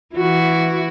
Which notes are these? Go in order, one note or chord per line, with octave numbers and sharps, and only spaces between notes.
E3 E4 F#4